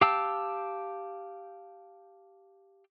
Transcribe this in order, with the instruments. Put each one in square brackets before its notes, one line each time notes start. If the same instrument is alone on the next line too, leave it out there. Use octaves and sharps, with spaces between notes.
[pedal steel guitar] G4 F5 G5 A5 E6